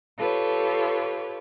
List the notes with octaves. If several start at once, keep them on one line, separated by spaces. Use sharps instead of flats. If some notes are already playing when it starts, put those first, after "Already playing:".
F4 G4 A4 B4 C#5